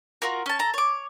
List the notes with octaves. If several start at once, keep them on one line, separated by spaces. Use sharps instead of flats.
F4 F#4 A#4
C#4 A5
A4 A#5
C#5 D6